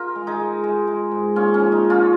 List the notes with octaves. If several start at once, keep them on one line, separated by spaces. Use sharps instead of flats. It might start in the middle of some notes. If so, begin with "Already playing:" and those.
Already playing: F4 A#4
G#3
D#4 G#4
G#3
G#3
G#3
G#2
A#2 C#4 F4
C#4
F3
D#4
A#2
C#4 F4